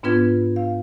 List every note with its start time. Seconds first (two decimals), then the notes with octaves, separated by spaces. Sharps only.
0.03 G#2 B3 D4 F4 B4 G#6
0.56 F5